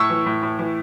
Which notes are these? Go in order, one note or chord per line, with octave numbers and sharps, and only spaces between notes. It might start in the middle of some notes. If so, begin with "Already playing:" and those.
Already playing: A2 C#6 E6
E3
A2
A2
E3